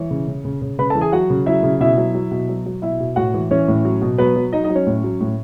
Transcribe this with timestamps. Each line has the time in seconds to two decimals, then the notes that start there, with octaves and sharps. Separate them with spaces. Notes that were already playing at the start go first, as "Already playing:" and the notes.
Already playing: E3 C#5
0.11 C#3
0.27 C#3
0.45 C#3
0.62 C#3
0.79 C#3 B4 B5
0.90 A4 A5
0.95 E3
1.01 G#4 G#5
1.12 F#3 F#4 F#5
1.30 C#3
1.46 F#3 E4 E5
1.63 C#3
1.80 B2 E4 E5
1.97 F#3
2.15 F#3
2.31 B2
2.49 F#3
2.66 F#3
2.82 B2 E4 E5
3.00 B2
3.16 A2 F#4 F#5
3.34 E3
3.51 E3 C#4 C#5
3.68 A2
3.85 F#3
4.02 B2
4.18 F#3 B3 B4
4.36 F#3
4.53 F#3 D#4 D#5
4.64 D#4 D#5
4.70 F#3
4.75 C#4 C#5
4.87 A2
5.04 F#3
5.20 A2